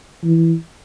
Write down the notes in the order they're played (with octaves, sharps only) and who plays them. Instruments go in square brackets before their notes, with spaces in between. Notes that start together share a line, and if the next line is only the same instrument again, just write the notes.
[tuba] E3